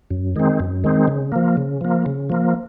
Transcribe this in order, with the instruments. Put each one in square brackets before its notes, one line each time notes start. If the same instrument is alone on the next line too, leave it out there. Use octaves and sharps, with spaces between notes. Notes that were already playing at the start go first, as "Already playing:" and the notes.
[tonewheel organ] F#2
D#3 G#3 C4
F#2
D#3 G#3 C4
C#3
F3 A#3
C#3
F3 A#3
C#3
F3 A#3